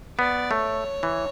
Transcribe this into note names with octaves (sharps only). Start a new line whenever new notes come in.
B3 D5
A3 C#5
E3